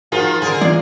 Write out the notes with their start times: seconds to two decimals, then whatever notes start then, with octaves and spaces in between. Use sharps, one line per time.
0.12 D#3 F3 F4 F#4 G#4
0.42 D3 G#4 A#4
0.61 E3 G#3 F4 D5